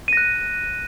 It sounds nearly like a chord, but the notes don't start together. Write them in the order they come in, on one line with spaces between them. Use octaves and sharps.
D#7 A#6 F#6